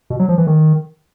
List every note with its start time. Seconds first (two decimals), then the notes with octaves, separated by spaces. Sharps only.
0.10 B2
0.19 F#3
0.29 F3
0.38 E3
0.47 D#3